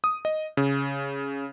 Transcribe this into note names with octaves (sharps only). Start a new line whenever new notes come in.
D#6
D#5
C#3